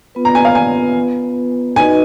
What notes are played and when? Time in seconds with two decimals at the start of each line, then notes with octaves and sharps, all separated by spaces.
0.15 B3 F4 B4
0.25 A#5
0.35 G#5
0.45 F5
0.55 G#5
1.76 D#4 F#4 B4 D#5 G#5